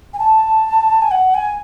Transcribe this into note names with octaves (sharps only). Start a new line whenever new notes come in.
G#5
A5
G#5
F#5
G#5